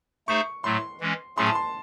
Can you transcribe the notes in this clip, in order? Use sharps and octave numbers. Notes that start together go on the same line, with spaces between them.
A3 D#4 G#4 C5 E5 C#6
A2 F#3 A3 C6
E3 G#3 C#4
A2 F#3 A3 C#4 G#4 C6
A5
C6